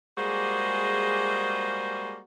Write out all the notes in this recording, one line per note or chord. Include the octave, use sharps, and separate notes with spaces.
G3 G#3 A#3 F#4 G#4 C5